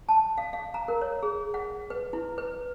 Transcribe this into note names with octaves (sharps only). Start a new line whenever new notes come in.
A5
F5
F5
A#5
A#4
C#5
G#4
F#5
B4
E4
B4